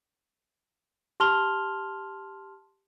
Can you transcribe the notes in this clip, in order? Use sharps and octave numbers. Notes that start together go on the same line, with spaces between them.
G4 A5 C6 F6 F7 G7